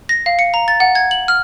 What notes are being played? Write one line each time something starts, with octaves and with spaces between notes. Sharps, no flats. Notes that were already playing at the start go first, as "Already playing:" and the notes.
A#6
F5
C#7
A#5
A6
F#5
G#6
F#7
F6